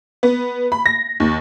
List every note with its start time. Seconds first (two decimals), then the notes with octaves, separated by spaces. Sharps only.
0.23 B3
0.72 B5
0.86 A#6
1.20 D#2